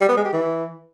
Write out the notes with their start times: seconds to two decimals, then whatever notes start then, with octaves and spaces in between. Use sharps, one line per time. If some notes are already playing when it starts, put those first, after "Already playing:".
0.01 G3
0.09 B3
0.17 G#3
0.25 G4
0.33 E3